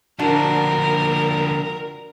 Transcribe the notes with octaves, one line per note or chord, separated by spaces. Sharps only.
D3 F3 D4 F#4 A#4